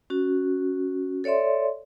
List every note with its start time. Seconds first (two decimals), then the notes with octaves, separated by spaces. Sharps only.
0.10 C#4 F#4
1.24 A4 C#5 D5 E5 C6